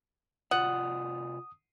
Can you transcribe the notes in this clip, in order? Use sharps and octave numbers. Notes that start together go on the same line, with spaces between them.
C3 F4 D5 F#5 D#6